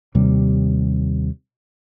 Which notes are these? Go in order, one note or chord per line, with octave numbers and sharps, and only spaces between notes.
D#2 C3 G3